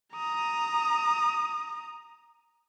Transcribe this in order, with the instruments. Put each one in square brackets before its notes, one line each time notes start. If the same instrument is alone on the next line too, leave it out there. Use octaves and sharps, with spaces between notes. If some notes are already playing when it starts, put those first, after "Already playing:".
[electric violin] A#5 D#6